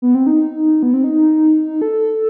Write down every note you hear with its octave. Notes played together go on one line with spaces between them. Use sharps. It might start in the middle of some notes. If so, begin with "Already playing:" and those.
B3
C4
D#4
B3
C4
D#4
A4